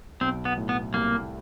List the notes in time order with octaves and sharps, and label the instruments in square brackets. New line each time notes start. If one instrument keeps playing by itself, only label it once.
[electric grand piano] B1 [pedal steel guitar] C4
[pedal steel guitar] B3
[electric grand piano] A2
[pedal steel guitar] B3
[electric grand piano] C2 [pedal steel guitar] A#3